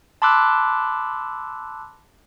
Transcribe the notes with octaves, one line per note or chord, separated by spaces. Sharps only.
A5 B5 C6 D6 E6 F#6